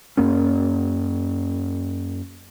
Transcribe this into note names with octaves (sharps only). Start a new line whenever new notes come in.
F#2 A#3 C#4